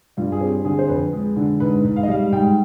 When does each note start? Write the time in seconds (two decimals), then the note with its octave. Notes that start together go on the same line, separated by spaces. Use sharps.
0.17 G2 F4
0.32 G#4
0.41 C4 G4
0.65 D3 G#4
0.79 C5
0.89 F2 B4
1.13 G#3
1.36 D3
1.60 G#2 B4
1.84 G#2
1.96 F5
2.03 D#5
2.08 G3 F5
2.32 G#2 G5